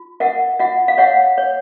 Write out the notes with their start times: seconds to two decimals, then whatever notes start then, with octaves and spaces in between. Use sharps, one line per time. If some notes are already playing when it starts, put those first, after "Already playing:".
Already playing: F4
0.20 A#4 E5 F#5
0.59 F4 E5 F#5
0.88 F5
0.98 C#5 E5 F#5
1.38 C#5